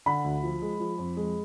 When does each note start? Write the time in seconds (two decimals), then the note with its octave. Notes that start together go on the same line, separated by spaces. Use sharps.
0.06 D3 B5
0.24 D2
0.43 F3
0.62 G#3
0.80 F3
0.98 F2
1.17 G#3